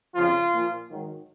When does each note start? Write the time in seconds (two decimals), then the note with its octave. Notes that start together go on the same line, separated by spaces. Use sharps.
0.14 F2 C#3 F3 F4
0.52 A#2 F3
0.89 G#2 D#3 F#3